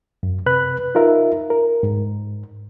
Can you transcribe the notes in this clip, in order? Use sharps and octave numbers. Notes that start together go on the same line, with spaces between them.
F#2
C3 B4 B5 F#6
D#4 F4 A#4 E5
A#4
G#2